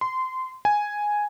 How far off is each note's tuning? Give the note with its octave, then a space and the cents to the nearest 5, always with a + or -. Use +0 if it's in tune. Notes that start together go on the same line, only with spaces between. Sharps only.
C6 -20
G#5 +0